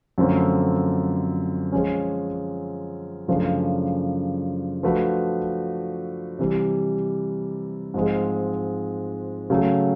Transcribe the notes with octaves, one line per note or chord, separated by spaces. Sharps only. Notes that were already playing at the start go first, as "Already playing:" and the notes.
F#2 D3 F3 A3 C4
F3 G#3 C#4
F#2 C#3 F3 A3 D4
F3 A3 D4 F#4 B4
C3 E3 G3
G#2 F3 G#3 C4
C#3 F#3 A3